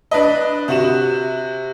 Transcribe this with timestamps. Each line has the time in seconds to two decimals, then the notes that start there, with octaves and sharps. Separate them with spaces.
0.11 D4 B4 D#5
0.68 C3 F#4 E7